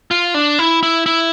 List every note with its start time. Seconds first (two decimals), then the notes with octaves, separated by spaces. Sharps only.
0.11 F4
0.34 D4
0.59 E4
0.83 E4
1.06 E4